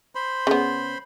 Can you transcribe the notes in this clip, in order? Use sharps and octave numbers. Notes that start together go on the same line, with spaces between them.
C5 B5 C6
C#3 B3